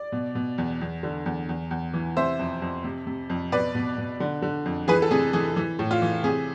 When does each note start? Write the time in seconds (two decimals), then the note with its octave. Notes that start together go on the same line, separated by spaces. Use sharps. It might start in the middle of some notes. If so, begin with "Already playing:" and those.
Already playing: D5
0.12 B2
0.35 B2
0.58 E2
0.81 E2
1.03 D3
1.26 E2
1.49 E2
1.71 E2
1.94 E3
2.17 C3 C5 E5
2.39 F2
2.62 F2
2.84 C3
3.07 C3
3.30 F2
3.52 B2 B4 D5
3.75 B2
3.98 B2
4.20 D3
4.42 D3
4.65 F2
4.88 E3 G#4 B4
5.02 A4
5.11 C3 G#4
5.33 E3 G#4
5.56 E3
5.79 A2
5.91 F4
6.02 E3
6.24 C3 G#4